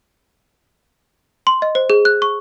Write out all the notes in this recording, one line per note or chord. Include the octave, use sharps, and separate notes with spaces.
C6
D#5
C5
G#4
F#6
C#6